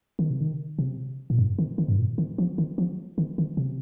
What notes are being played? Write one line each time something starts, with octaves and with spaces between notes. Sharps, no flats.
D#3
C3
D#3
C3
A#2
G2
D#3
D#3
G2
A#2
D#3
F3
D#3
F3
D#3
D#3
C3